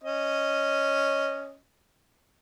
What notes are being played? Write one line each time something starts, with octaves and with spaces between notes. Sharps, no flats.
C#4 D#5